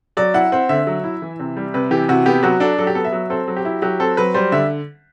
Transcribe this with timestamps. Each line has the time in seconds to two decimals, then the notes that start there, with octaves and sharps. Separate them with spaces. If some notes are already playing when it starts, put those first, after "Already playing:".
0.17 F#3 D5
0.34 E4 F#5
0.52 C4 F#5
0.69 D3 E5
0.87 F#3
1.04 E4
1.22 E3
1.39 C3
1.57 G3
1.74 C3 B4
1.91 E3 G4
2.09 C3 F#4
2.26 B3 G4
2.43 F#3 F#4
2.60 D4 A4
2.78 F#3 A4
2.87 G4
2.95 B3 A4
3.05 E5
3.12 F#3
3.30 C4 A4
3.48 F#3
3.57 G4
3.65 E4
3.82 F#3 G4
4.00 C4 A4
4.17 F#3 B4
4.34 G3 C5
4.52 D3 E5